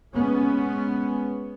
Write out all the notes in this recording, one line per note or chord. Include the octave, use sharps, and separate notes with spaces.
G#3 B3 C#4